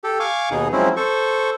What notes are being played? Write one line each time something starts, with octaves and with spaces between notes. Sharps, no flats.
G4 A4
F5 G#5 C#6 D6
D#2 B2 D#4 G#4
F3 F#3 G#3 C4 C#4 E4
A4 C5 C#6